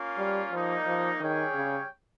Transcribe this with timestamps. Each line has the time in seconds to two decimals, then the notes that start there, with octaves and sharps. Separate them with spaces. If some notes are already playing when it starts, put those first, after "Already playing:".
Already playing: A#3 C#4 F4
0.18 G3
0.52 F3 G3 A#3 D#4
0.87 F3
1.20 D#3 G3 C#4 G#4 C#5 G5
1.54 C#3